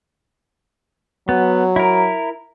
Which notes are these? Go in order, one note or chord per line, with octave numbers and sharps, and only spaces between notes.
F#3 B3
E4 A#4